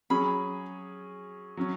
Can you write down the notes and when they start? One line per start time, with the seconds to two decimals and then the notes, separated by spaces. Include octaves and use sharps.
0.10 F#3 C#4 G#4 B5
1.57 F#3 C#4